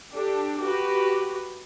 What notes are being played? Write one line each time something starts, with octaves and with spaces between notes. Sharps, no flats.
D4 G4 A4
F#4 G4 B4